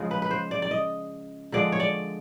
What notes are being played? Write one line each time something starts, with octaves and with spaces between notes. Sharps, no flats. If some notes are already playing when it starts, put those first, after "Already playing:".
Already playing: C#3 F3 G#3
B4
B4
C5
D5
D5
D#5
D3 F3 G#3 D5
C#5
D5